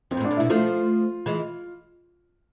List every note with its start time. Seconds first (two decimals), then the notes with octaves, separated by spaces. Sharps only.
0.11 F2 C4
0.17 A2
0.20 G#2
0.25 D4
0.31 A2
0.37 B2 E4
0.50 F3 A3 F4
1.26 E3 G#3